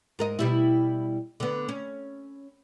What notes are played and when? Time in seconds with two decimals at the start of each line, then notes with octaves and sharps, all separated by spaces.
0.19 G#2 A#4 D#5
0.39 B2 G3 E4
1.40 D3 B3
1.69 C#4